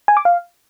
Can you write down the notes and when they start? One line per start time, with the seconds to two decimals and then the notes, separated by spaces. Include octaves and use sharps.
0.08 G#5
0.17 D6
0.25 F5